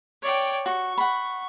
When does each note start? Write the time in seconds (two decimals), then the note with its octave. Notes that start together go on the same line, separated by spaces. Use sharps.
0.22 C#5 D5 G5
0.66 F#4 C#6
0.97 F#5 B5